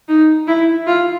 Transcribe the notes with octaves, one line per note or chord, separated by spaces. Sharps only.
D#4
E4
F4